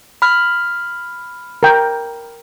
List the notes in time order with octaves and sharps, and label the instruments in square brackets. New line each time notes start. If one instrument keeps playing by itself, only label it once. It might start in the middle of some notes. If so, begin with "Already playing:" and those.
[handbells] B5 F6
[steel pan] A#4 G5